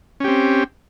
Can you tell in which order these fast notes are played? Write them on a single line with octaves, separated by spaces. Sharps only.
C#4 G4 C4